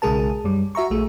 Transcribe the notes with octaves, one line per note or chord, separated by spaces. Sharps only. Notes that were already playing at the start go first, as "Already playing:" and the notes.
B1 C#3 G#3 G#4 A#4 A5
F#2 G3
F#4 E5 A#5 C#6
A#1 A3 G#4